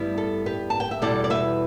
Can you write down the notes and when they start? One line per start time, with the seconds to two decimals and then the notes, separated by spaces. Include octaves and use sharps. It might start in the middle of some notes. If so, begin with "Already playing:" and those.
Already playing: G2 G3 B3 E4
0.18 A4
0.46 G4 B4
0.70 A5
0.80 G5
0.91 E5
1.02 E2 B2 G3 E4 A4 D5
1.24 D5
1.30 B4 E5